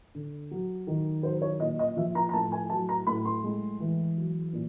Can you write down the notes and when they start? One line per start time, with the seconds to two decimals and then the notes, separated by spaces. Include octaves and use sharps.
0.15 D3
0.51 F#3
0.87 D#3
1.23 F#3 C5
1.42 C#5
1.60 A#2 D#5
1.79 D#5
1.97 F3 E5
2.15 A#5
2.29 A#5
2.33 A2 A5
2.52 G#5
2.70 F#3 A5
2.89 A#5
3.07 A2 B5
3.25 C6
3.44 G#3
3.80 E3
4.17 F#3
4.53 A#2